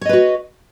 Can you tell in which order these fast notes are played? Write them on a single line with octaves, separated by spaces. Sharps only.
C#5 D#5 B4 F#4